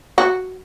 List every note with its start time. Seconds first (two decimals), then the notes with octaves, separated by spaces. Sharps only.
0.18 F#4